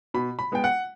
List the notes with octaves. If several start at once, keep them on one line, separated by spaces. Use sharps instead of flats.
B2 B5
B5
G#3 B3 G5
F#5